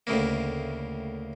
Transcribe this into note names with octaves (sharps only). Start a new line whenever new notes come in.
D2 A2 C#3 A#3